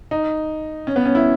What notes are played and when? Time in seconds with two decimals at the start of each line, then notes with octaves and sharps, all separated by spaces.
0.11 D#4
0.87 C#4
0.96 B3
1.05 C#4
1.15 E4